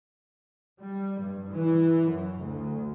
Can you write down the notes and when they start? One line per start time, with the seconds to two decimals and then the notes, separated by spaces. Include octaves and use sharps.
0.80 G3
1.21 G2
1.52 E3
2.09 F#2
2.38 D2